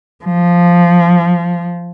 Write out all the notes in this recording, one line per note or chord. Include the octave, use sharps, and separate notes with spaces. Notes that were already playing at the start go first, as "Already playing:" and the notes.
F3